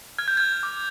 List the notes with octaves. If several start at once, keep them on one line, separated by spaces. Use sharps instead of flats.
F6 G#6
G6
F6 G#6
D6